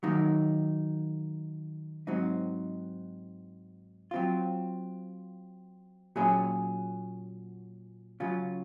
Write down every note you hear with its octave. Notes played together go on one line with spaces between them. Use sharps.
D#3 F#3 A#3 D#4
G#2 F#3 C4 D#4
F#3 C4 F4
A#2 F#3 C#4 G#4
C#3 F#3 C#4 F4